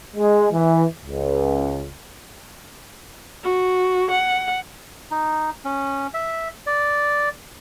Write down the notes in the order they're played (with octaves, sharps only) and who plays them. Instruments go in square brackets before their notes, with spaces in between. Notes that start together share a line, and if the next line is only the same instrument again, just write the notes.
[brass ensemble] G#3
E3
C#2
[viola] F#4
F#5
[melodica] D#4
C#4
E5
D5